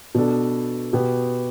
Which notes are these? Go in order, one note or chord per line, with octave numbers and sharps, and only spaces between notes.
B2 B3 D4 A4
B2 B3 G4